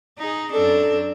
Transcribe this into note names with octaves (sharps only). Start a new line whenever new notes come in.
D#4 G#4
F#2 C4 D4 A4